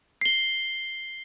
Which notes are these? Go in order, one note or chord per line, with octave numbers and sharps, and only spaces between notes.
C7 G7